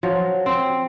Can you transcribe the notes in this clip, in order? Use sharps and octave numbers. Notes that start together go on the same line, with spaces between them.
F3 F#3
C4